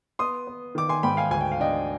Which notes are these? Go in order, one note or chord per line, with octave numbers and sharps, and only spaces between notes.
B3 C6 D#6
B3
D#3 D6
G#5 C6
G#2 G5 B5
F5 G#5
D2 G#5
G5
F5
D4 D#5 G5